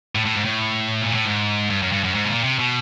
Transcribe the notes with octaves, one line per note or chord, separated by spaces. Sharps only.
A2
A2
G#2
A2
A#2
A2
G#2
G2
F#2
G2
F#2
G#2
B2
A#2
C3
B2